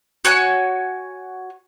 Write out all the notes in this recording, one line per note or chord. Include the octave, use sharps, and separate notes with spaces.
F#4 C#5 G#5 F#6